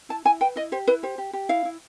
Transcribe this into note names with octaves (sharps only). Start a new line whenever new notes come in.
E4 A5
E4 G#5
B4 G5
E4 D#5
G4 C5
E4 B4
G4 C5
G4
G4
E4 F5
E4